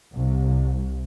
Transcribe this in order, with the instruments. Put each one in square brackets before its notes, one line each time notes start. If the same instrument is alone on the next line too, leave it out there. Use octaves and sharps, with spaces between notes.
[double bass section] C2